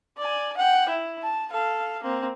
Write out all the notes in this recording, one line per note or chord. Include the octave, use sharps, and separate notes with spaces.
D5 G#5
F#5 G5
E4
A5
A4 F5
A#3 C4